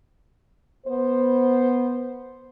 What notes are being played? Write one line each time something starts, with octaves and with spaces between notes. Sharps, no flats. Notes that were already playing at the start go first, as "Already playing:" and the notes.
B3 C5